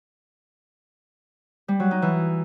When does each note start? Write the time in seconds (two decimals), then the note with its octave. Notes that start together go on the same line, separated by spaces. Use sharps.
1.68 G3
1.80 F#3
1.91 D#4
2.02 E3